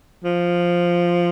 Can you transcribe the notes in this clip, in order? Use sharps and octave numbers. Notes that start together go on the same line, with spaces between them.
F3